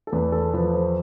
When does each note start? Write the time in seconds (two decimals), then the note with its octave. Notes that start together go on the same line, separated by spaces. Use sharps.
0.07 A4
0.12 E2 B4
0.32 A4
0.53 F3 B4
0.74 C5